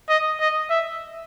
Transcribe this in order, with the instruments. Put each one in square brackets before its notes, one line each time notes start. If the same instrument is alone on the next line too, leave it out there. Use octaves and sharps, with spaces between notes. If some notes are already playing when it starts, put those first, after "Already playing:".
[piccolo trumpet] D#5
D#5
E5